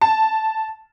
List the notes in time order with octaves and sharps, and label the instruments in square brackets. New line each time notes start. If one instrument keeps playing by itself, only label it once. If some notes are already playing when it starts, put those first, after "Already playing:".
[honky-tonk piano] A5